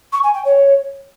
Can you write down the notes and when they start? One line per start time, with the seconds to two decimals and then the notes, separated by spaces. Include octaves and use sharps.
0.12 C#6
0.23 G#5
0.34 G5
0.45 C#5